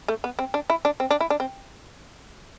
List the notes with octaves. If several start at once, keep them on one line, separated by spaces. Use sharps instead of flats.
A3
B3
C4
D4
E4
D4
C4
D4
E4
D4
C4